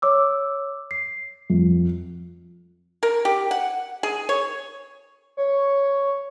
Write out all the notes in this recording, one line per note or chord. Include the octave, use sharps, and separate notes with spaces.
C#5 D6 E6
C7
F2
A#4
G4
F#5
G#4
C#5
C#5